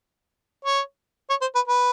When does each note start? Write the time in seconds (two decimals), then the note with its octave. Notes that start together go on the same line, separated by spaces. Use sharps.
0.65 C#5
1.30 C#5
1.41 C5
1.55 B4
1.68 B4